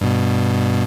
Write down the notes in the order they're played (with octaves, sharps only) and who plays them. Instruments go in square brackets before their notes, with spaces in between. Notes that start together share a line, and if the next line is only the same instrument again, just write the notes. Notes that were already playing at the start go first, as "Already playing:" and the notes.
[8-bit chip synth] G2 B2